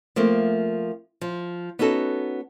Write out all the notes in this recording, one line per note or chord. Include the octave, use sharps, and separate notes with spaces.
F3 A3 A#3 C4
F3
B3 C#4 D#4 F#4 A4